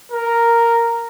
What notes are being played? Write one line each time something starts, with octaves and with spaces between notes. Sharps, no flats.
A#4